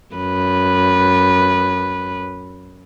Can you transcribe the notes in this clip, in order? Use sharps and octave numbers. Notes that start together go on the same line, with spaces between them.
F#2 B4